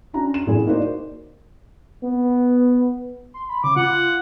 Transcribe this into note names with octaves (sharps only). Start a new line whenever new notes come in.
C#4 D4 F#4 A#5
E7
A2 F#3 G#4
A#3 D#4 F#4 A#4 C5 D5
B3
C6
B5
C#3 D6
F4 F#5